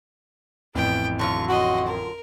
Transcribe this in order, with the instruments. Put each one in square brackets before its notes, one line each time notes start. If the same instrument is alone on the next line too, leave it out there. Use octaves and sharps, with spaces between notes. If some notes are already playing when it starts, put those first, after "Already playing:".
[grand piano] A1 F2 E3 [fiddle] B3 G5
[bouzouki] D3 F#3 F4 [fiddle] C#6
[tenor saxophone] F#4 [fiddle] D#5 C6
[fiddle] A#4